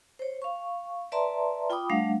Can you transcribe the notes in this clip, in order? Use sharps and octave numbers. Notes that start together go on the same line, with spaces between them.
C5 C#5
F5 C#6
B4 D5 E5 A5 A#5 C6
F4 G5 B5 D6 D#6
G3 A3 D4 F5 F#5